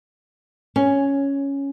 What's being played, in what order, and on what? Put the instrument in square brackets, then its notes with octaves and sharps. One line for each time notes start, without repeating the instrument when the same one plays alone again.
[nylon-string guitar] C#4